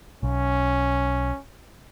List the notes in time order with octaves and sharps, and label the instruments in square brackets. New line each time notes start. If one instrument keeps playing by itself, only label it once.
[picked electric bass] B1 [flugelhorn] C#4